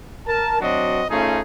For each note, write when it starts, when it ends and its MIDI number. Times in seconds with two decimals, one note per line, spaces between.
0.27 0.58 70
0.27 0.58 81
0.60 1.03 54
0.60 1.03 60
0.60 1.03 62
0.60 1.03 66
0.60 1.03 75
1.10 1.40 57
1.10 1.40 61
1.10 1.40 63
1.10 1.40 65
1.10 1.40 68